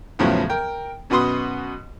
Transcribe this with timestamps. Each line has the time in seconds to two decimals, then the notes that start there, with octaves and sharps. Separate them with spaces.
0.19 E2 A2 C#3 F3 F#3 B3
0.50 A#4 G5
1.10 F#2 B2 F#4 B4 C6 D#6